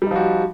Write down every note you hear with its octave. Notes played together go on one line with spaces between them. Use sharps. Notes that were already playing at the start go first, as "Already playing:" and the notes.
F3 G3 D#4 F#4 G4